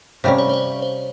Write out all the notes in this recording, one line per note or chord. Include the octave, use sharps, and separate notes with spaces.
C3 G3 C#4 F5
C#5
C5
C#5
C5